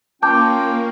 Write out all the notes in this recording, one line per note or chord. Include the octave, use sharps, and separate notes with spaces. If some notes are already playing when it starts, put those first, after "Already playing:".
A#3 C#4 F4 G5 A5 D6 G6